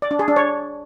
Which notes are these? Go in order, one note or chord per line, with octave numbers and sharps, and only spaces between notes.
D5
D4
G#4
D4
C#5